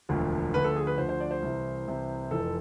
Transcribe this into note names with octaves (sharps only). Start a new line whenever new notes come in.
E1 D2 D3 F3
D2 D3 F3 B4
A4
G#4
B4
D2 D3 F3 C5
C5
D5
C5
C2 C3 E3
C2 C3 E3
F1 F2 E3 A4